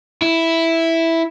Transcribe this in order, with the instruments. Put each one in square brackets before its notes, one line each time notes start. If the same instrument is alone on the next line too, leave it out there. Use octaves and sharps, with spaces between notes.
[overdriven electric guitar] E4